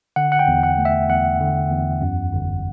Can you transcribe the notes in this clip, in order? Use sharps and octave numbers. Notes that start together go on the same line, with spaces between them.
D3 F#5
F#5
G5
E2
F#5
A3
E5
E2 F#5
D3
E2
F#2
G1